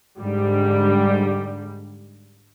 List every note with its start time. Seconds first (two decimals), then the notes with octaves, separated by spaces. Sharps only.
0.19 G#2 D3 G3